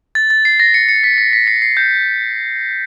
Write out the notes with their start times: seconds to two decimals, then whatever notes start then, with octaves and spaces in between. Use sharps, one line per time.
0.15 A6
0.30 A6
0.45 C7
0.60 A#6
0.74 C#7
0.89 C#7
1.04 B6
1.18 B6
1.33 B6
1.47 C7
1.62 C7
1.77 G6